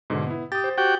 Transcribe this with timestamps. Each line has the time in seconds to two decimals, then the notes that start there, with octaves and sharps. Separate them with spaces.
0.10 G#2 B2 D3
0.27 B3 E4
0.52 G4 D#6 A6
0.64 C5
0.78 F#4 G4 G5